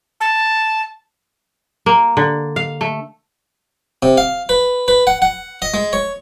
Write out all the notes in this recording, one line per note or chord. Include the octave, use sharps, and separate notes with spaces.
A5
A#3
D3
F5
A3
C3
F5
B4
B4
F#5
F#5
D#5
G#3
C#5